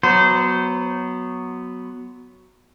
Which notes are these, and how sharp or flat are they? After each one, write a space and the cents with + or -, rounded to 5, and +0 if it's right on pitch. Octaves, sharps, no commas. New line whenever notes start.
F#3 +0 B3 +0 C5 -25